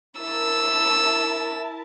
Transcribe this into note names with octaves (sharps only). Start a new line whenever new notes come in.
E4 A#4 E5 A5 E6